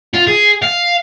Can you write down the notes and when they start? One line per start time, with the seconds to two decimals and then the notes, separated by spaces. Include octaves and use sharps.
0.14 F4
0.27 G#4
0.62 F5